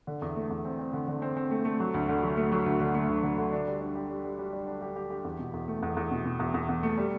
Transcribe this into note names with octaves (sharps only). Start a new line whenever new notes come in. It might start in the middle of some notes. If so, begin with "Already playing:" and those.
D3
E2
A3
E2
C4
C4
D3
D3
C4
C4
A3
A3
F#3
D2
D3
F#3
A3
F#3
D2
D3
A3
D2
D3
D3
D4
G3
D4
G4
G3
G3
G3
D4
D4
G4
G4
G4
E2
B2
E2
A3
E2
E2
B2
B2
E2
E2
E2
A3
G3